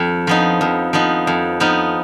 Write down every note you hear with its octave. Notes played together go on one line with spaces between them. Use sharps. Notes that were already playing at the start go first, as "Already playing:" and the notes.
Already playing: F2
F3 B3 D#4
F2
F3 B3 D#4
F2
F3 B3 D#4